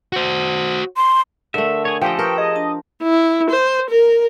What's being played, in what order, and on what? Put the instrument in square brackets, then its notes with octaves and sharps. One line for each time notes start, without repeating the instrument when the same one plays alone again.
[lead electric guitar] F#4 C5
[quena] C6
[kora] D3 A3 [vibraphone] A#4 [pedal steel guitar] E5
[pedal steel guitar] G#4 C#5
[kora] F3 G4 D#5 [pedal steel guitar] A4 [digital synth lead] G5 [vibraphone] G#5
[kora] A#4 [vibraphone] B4 C#6 D#6 [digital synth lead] G5
[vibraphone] G#4 [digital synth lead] D#5
[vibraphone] D4 A5
[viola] E4
C5
A#4